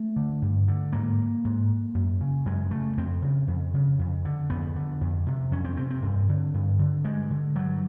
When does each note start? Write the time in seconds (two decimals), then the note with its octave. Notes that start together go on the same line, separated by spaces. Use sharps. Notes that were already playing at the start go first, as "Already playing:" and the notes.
Already playing: A3
0.16 D3
0.42 G2
0.68 D3
0.92 G#2 A#3
1.45 G#2
1.95 F#2
2.21 C#3
2.46 F#2 G#3
2.71 C#3 A3
2.97 F2 C4
3.22 C#3
3.48 F2
3.74 C#3
3.99 F2
4.25 D3
4.50 F2 B3
4.75 D3
5.01 F2
5.27 C3
5.51 F2 C#4
5.65 C4
5.77 C3 C4
5.90 C4
6.03 G2
6.29 D3
6.54 G2
6.79 D3
7.04 G2 G#3
7.31 D3
7.55 G2 F#3